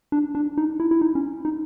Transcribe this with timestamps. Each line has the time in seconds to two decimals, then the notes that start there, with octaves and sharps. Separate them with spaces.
0.12 D4
0.35 D4
0.57 D#4
0.80 E4
0.91 E4
1.01 D#4
1.15 C#4
1.45 D#4